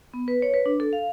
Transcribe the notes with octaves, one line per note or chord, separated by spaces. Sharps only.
B3
B4
C#5
B4
D4
A4
F5